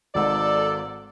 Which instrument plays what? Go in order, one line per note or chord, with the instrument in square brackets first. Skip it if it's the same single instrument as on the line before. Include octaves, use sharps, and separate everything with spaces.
[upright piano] G#1 G#2 [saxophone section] A4 D5